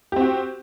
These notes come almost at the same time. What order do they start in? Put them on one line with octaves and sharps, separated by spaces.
G4 C4 F#4